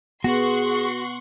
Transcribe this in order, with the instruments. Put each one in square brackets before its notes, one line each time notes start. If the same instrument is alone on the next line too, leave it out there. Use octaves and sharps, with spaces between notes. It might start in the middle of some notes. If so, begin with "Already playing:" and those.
[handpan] B3 [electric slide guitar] F#4 [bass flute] G#4 [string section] F#5 C6 C#6